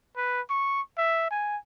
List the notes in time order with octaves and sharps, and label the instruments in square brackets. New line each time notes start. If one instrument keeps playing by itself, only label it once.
[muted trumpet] B4
C#6
E5
G#5